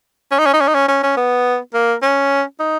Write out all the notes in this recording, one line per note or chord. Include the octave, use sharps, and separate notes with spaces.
C#4
D#4
C#4
D#4
C#4
D#4
C#4
C#4
C#4
B3
A#3
C#4
D#4